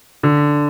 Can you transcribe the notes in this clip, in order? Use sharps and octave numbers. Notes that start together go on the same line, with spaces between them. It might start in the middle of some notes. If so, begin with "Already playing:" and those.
D3